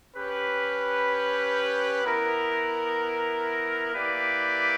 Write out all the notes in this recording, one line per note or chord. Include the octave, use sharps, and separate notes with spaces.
C#4 G4 B4
B3 E4 A#4
A#3 E4 G4 B4 D5